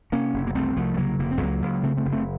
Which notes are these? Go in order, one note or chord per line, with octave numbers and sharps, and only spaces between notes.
C3 A#3 C#4
F#1
A#3
C2 A3 C4
C2 F3 A3
A3
C#3 F#3 A#3
F1 A#3
C4
C#2 F#3 A#3
C#2
C#3 A3 C4
A3 C4
F#1
A3 C4